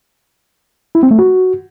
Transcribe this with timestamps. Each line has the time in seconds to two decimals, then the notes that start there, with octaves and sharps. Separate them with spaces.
0.95 E4
1.03 C4
1.11 A3
1.19 F#4